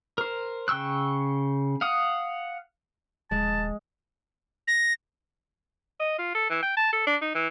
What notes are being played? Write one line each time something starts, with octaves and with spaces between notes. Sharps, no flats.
A#4 C5
C#3 G5 C#6 E6 F#6
F5 F#5 D#6
D#1 G#3 A5
A#6
D#5
F4
A4
E3
G5
A5
A4
D4
D#4
E3